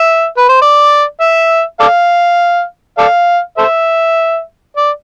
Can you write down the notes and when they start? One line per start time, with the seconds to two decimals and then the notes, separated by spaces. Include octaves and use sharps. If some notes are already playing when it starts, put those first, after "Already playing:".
Already playing: E5
0.37 B4
0.49 C5
0.62 D5
1.21 E5
1.80 A4 D5 F5
2.98 A4 D5 F5
3.58 A4 C5 E5
4.77 D5